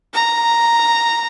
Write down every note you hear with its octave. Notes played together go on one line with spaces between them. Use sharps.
A#5